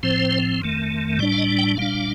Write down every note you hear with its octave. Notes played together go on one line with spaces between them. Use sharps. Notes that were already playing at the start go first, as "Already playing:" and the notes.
A2 F3 C4 C5
F2 D#3 A3
A2 G3 D4 D5
F5
D#5
G5
A#2 G3 D4 F5